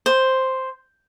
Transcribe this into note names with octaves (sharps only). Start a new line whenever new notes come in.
C5